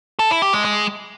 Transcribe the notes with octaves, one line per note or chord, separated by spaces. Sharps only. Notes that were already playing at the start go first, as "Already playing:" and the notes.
A4
E4
G4
G#3
G#3